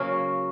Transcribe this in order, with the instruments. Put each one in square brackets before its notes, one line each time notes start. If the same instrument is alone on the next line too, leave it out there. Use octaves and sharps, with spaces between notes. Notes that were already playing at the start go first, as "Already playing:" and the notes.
Already playing: [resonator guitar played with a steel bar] C#3 F#3 A#3